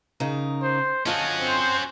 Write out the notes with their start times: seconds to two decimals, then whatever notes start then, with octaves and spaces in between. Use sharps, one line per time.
0.20 C#3 D#4 A#4
0.62 C5
1.06 D3 C#4 F4 F#4 D#5 A5
1.38 C4 C5